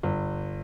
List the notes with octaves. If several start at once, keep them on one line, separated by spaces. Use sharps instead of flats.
G1